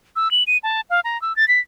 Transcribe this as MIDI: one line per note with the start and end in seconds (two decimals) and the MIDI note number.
0.16 0.31 88
0.31 0.43 102
0.47 0.58 99
0.63 0.81 81
0.90 1.00 77
1.04 1.20 82
1.22 1.35 88
1.36 1.48 93
1.48 1.60 95